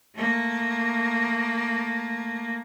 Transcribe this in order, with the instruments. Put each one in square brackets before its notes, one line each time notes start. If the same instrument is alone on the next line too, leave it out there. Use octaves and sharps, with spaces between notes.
[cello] A3 A#3